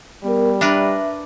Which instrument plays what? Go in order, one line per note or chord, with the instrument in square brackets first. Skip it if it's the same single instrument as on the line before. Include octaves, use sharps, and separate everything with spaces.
[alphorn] G3 [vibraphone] B3 A#4
[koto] D4 A#4 B4 [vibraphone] E5